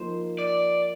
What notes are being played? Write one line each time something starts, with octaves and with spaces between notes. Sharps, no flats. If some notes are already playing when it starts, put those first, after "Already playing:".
Already playing: F3 A#3 D#4 C5
D5